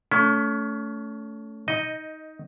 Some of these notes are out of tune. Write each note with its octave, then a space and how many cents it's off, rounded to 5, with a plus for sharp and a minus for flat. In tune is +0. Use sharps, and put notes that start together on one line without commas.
A3 +0 C#4 +30
D#4 +15 D#5 +0